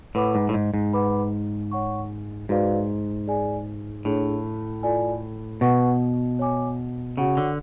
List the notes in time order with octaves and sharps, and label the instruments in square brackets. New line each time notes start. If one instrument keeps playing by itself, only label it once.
[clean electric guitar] A2 [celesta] B4 F#5 B5 D6
[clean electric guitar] G#2
A2
G#2
G#2
[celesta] B4 F#5 B5 D6
C#5 F#5 C#6
[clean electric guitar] G#2 [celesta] F#4 B4 D5 F5
[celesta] G#4 D5 G#5
[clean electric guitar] A2 [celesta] D4 G#4 C#5
[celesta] F4 A4 D5 G#5
[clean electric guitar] B2 [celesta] B4 F#5 C#6
[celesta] C#5 G#5 D6
[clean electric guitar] C#3 [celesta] F#4 C#5 F#5 C#6
[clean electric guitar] D3